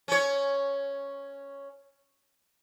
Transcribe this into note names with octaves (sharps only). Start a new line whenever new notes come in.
C#4 C#5